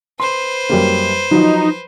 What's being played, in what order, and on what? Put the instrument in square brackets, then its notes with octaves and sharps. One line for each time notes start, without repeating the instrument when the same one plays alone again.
[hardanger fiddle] B4 C5 [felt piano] C6
[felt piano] F#2 G3 A#3
[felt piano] F3 F#3 [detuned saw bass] D#4